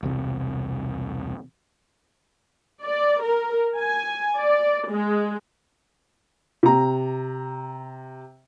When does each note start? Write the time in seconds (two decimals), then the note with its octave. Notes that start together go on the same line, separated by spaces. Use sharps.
0.03 E1 C2 C3
2.84 D5
3.23 A#4
3.77 G#5
4.37 D5
4.90 G#3
6.63 C3 A#5